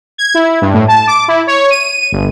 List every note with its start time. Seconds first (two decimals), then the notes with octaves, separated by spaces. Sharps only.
0.18 G#6
0.34 E4
0.62 G2
0.74 A2
0.88 A5
1.07 D6
1.28 E4
1.47 C#5
1.71 D#7
2.12 G1